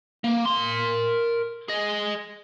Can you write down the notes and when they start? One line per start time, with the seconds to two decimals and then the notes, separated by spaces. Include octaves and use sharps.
0.24 A#3
0.45 A#4 C6
1.68 G#4 D#5